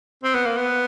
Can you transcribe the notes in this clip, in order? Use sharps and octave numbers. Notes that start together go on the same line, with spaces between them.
C4
B3
A#3
B3